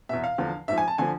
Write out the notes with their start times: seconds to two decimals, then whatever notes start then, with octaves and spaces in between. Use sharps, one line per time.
0.09 E2 B2 E5
0.24 F5
0.38 E2 D3 F3
0.68 G#2 F3 E5
0.78 G#5
0.88 A5
0.98 D3 F3 G#5